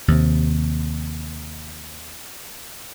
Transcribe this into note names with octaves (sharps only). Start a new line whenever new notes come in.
D#2 C3